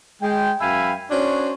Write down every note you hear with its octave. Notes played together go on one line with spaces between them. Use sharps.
G#3 G5
F#2 E5 F5 G5 G#5 B5
C#4 D4 F#4 C5 C#5